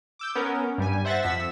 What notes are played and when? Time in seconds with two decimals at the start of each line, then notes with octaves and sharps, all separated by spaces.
0.19 D6 E6 G6
0.35 B3 C#4 A#4
0.78 G2 G3 G#5
1.05 C5 E5 F#5 A6 A#6
1.23 F2 E6 B6